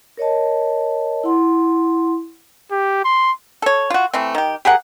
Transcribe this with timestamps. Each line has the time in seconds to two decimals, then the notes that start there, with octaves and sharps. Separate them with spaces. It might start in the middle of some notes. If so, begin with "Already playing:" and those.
0.17 A#4 C#5 D#5 A5
1.24 E4 F#5 C6
2.71 G4
3.04 C6
3.62 A4 C#5
3.90 F4 F#4
4.13 E3 A3 C4
4.35 D#3 G4
4.65 G4 G#4 A#4 F#5